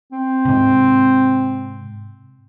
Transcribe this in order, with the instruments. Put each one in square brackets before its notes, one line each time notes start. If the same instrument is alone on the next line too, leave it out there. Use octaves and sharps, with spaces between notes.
[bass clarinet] C4
[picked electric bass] G#2 C3